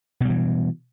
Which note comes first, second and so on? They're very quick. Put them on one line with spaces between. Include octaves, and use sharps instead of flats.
B2 G3 E3